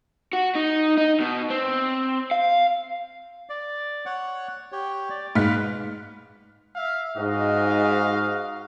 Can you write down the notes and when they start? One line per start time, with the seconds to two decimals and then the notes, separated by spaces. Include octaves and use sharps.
0.33 F#4
0.55 D#4
0.98 D#4
1.20 B2
1.50 C4
2.31 F5
3.49 D5
4.06 C#5 F#5
4.72 G4 C#5
5.10 D5
5.35 G#2 B4 F5 F6 B6
6.76 E5 F5
7.17 G#2 F#4 D#5 F5